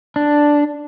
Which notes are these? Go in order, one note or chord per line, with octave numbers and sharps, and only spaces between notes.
D4